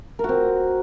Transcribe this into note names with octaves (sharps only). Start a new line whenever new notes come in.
C4 F#4 A#4